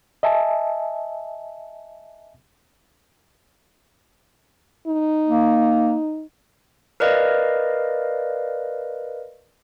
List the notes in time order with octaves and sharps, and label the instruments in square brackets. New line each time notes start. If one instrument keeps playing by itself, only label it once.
[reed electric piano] D#5 E5 G#5 A5
[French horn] D#4
[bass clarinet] A#3
[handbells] A#4 B4 D5 D#5 F5